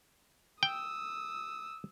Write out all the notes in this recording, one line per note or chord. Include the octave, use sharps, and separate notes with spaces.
G5 D#6 E6